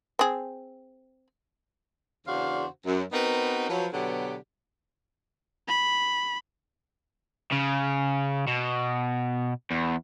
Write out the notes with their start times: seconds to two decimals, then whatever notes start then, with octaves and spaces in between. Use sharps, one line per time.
0.19 C4 G#4
2.27 E2 C#3 D4 F#4 C5 F5
2.86 F#2
3.12 B3 C4 D#4 F#4 A#4 B4
3.69 F3 F#3 B4
3.93 B2 D3 F#3 B3 G4
5.68 B5
7.52 C#3
8.47 B2
9.71 E2